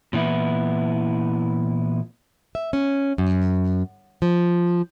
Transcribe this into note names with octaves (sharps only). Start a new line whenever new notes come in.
A#2 E3 B3 E4
E5
C#4
F#2
F3